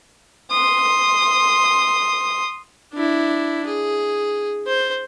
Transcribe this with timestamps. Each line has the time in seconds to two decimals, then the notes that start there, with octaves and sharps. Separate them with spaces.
0.51 C6 D#6
2.94 D4 E4
3.66 G#4
4.66 C5